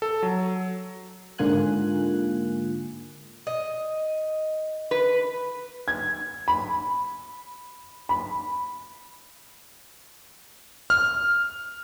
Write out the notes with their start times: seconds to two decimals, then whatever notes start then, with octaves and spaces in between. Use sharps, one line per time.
0.02 A4
0.23 F#3
1.38 G#2 D3 A#3 F4 G#5 F#6
3.47 D#5
4.91 B4
5.88 G#6
6.48 B5
8.09 B5
10.90 F6